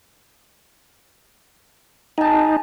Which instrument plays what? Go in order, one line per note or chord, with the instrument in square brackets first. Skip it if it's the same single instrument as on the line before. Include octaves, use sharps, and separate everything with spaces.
[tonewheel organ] D#4 [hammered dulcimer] G#5 A5